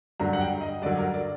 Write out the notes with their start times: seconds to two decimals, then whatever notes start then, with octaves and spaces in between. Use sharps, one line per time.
0.20 G2 D3 F#3 A#5
0.33 F#5
0.41 G5
0.61 D#5
0.82 G2 D3 F#3 D5
0.98 A#4
1.14 D5